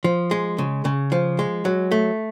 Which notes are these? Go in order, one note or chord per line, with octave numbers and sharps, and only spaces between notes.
F3
G#3
C#3
C#3
F3
G#3
F#3
A3